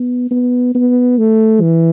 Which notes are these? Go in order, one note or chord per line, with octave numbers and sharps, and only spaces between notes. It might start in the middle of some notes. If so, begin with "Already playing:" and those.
Already playing: B3
B3
B3
A3
E3